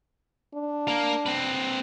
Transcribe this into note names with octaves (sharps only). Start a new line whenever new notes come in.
D4
A#3 A#4
C4 B4